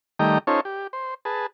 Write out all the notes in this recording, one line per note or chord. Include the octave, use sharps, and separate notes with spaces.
D#3 G3 A3 D#5 G5 A#5
C#4 D#4 F4 A4 C5 C#5
G4
C5
G#4 B4 A5